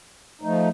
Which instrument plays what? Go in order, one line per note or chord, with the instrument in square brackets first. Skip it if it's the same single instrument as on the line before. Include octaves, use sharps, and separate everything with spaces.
[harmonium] F3 A3 D#4